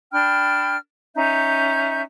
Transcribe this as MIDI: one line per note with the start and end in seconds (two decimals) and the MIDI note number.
0.12 0.76 62
0.12 0.76 79
0.12 0.76 83
0.12 0.76 89
1.16 2.02 61
1.16 2.02 63
1.16 2.02 76
1.16 2.02 91